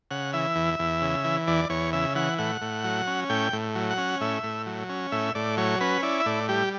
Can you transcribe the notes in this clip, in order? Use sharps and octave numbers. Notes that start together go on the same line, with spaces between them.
C#3 F#5
E3 E5
E2
E2
C#3
E3
E2 D5
E2 C#5
C#3 E5
E3 F#5
A2 F#5
A2
F#3
C#4
A2 G5
A2
F#3
F#5
C#4
A2 E5
A2
F#3
C#4
A2 E5
A2 D5
F#3 C#5
C#4 B4
E4 D5
E5
A2 D5
G3 G4